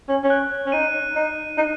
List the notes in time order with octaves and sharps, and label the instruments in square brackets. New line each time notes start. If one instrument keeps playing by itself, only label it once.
[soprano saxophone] C#4
C#4
[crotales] F#6
[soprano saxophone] C#4
[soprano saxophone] D#4 [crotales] D#7
[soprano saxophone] D#4
D#4